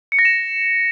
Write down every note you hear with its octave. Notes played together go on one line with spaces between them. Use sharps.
C#7
A#6
E7